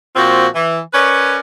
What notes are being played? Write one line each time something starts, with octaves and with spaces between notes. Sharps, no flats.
A#2 F3 C4 F4 F#4
E3
C#4 A#4 B4 C#5 D5